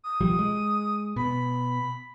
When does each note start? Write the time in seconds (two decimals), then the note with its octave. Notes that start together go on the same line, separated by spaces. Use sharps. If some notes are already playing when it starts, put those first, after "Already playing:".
0.04 D#6
0.21 B1 F3 G3
0.39 G#3
1.16 B2 B5